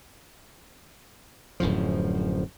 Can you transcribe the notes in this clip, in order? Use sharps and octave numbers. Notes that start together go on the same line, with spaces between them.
D1 F#2 A2 F3